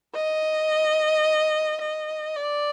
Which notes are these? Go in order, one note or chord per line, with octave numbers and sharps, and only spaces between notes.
D#5
D#5
D5